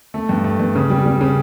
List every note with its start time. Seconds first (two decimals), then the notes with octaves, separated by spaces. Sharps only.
0.14 A3
0.29 G2
0.44 A3
0.60 G2
0.75 C#3
0.90 G3
1.06 G3
1.21 C#3